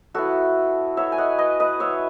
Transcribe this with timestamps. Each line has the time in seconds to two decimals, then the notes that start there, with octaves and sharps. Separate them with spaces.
0.14 F#3 B3 E4 F#4 A4
0.97 F#3 B3 E4 C#5 E5
1.12 G#5
1.18 D#5 F#5
1.38 B4 D#5
1.60 B4 D#5
1.79 F#3 B3 E4 C#5 E5